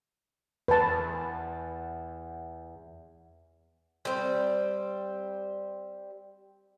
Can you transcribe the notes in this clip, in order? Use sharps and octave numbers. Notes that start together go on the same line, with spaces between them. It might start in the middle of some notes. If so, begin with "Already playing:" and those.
E2 B4 A5
G3 C4